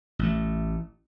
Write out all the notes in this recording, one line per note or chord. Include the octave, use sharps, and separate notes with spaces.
A1 A3